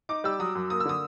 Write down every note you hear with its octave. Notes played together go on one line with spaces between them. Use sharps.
D#4 D6
G3 E6
F#3 D#6
F#2
A#3 D#6
E6
D3 D#6